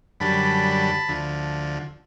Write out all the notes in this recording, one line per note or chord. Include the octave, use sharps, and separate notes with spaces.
F#2 D3 G3 A5 B5
D2 D3 F3